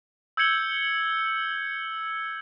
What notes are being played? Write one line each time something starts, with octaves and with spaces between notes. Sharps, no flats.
E6 G6 G#6 C#7 F#7 G7